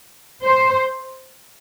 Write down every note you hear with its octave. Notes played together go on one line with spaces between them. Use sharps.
C5